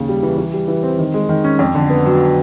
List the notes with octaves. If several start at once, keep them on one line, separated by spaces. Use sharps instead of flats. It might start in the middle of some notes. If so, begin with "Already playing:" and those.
Already playing: D#2 C#3
G3
E3
E3
G3
E3
C4
D#3
G#3
D#3
C#4
F2
D3
B3
F#3